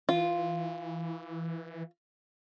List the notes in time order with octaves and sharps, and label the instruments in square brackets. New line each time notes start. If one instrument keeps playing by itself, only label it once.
[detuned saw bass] E3 [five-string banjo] F4